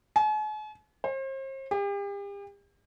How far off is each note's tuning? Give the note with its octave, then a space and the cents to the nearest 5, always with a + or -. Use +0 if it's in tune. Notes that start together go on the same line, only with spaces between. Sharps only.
G#5 +45
C5 +40
G4 +40